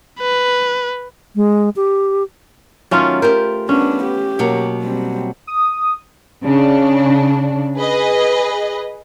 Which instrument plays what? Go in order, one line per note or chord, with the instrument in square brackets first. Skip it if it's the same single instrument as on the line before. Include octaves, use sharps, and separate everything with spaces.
[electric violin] B4
[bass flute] G#3
G4
[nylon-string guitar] D#3 F#3 [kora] A3 C#4 F4
[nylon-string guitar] G4 A#4 [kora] C5
[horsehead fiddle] B3 D4 [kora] C#4
[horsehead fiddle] G4
[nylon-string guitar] B2 F#3 A#3
[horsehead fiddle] G3 C4
[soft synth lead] D#6
[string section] C#3 D4
G#4 B4 D#5